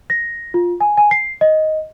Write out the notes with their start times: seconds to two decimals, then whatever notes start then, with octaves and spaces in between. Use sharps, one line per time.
0.10 A#6
0.54 F4
0.81 G#5
0.97 G#5
1.11 C7
1.41 D#5